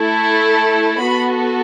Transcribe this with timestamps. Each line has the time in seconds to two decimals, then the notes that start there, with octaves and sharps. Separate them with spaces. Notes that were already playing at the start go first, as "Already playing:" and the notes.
Already playing: A3 E4 A4
0.99 B3 F#4 A4 B5